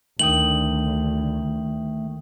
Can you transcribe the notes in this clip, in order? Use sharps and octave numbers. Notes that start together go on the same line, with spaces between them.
D2 D#3 A3 G5 D#6 F#7